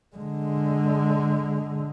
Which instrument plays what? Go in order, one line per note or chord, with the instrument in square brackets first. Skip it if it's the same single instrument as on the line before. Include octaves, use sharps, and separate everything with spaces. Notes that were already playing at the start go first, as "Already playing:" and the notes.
[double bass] D3 G#3